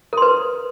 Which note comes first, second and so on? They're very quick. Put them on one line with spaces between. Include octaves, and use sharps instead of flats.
A#4 C6 B4